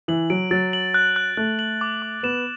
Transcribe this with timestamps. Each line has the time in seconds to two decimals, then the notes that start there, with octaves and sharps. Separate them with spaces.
0.08 E3 F#7
0.30 F#3 D7
0.51 F#3 A6
0.73 F#7
0.94 F#6
1.16 F#6
1.37 A3 F#6
1.59 F#7
1.81 D6
2.02 D6
2.23 B3 E7